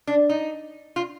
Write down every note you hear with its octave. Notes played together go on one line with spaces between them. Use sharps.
D4
D#4
F4